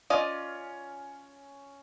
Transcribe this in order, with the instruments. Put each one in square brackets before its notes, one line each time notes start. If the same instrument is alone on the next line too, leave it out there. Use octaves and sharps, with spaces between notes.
[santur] C#4 [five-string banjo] F4 D5 D#5